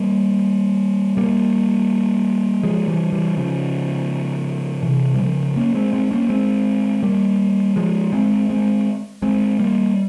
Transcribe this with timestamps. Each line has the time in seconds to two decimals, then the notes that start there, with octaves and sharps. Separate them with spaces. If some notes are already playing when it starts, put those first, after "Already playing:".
Already playing: G3 A#3
1.17 G3 A#3
2.63 F3 G#3
2.88 E3 G3
3.12 E3 G3
3.37 C#3 F3
4.83 C3 E3
5.14 G3
5.20 C#3 F3
5.56 A#3 C#4
5.74 G#3 C4
5.93 G#3 C4
6.11 A#3 C#4
6.29 G#3 C4
7.03 G3 A#3
7.76 F3 G#3
8.13 G#3 C4
8.49 G#3 C4
9.22 G#3 C4
9.59 G3 A#3